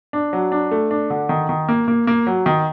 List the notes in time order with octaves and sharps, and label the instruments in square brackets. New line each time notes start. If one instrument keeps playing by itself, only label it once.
[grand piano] D4
F#3
D4
A3
D4
D3
D#3
D#3
A#3
A#3
A#3
F#3
D#3